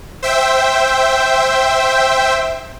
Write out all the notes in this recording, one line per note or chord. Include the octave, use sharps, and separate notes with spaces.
C5 E5 G5